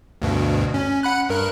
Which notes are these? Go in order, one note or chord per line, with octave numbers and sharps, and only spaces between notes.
D2 G2 B2
C#4
F#5 B5 F#6
G2 A#4 F#6